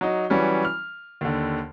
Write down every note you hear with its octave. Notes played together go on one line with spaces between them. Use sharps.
F#3 D#4
E3 F#3 G3 C#4
F6
D#2 D3